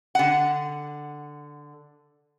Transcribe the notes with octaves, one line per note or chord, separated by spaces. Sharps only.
D3 F#5